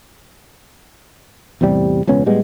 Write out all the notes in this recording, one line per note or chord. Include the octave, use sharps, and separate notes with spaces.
E2 A2 C3 G3
E1 C#2 B3 C#4
A2 G3 G#3 B3